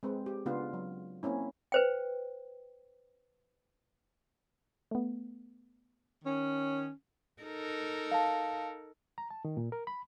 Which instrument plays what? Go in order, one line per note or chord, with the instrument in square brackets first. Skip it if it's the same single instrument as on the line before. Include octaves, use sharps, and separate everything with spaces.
[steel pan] G#3 C4 B4
G4
C#3 B3 D4 F4
F#3
A#3 C4 C#4 E4
[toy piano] B4 C5 G5
[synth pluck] A3 B3
[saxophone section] D#3 C#4
[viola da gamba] D#4 A4 A#4
[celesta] F5 A5
[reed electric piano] A#5
A5
D#3
A#2
A#4
B5